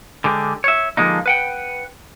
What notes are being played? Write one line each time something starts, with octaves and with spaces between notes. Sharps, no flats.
D3 G#3 G4
C#5 E5
D3 F3 G#3 A#3 D#4
B4 F#5 G5